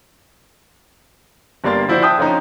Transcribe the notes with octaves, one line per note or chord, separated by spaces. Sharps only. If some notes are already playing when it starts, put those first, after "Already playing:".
G1 G3 A#3 D4 C6 A6
F3 E4 F#4 C5 D5
E5 G5 A5 D#6 F#6 G6
D3 F3 C#4 D#4